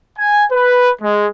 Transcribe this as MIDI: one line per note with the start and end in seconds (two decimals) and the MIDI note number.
0.17 0.44 80
0.51 0.89 71
1.01 1.27 56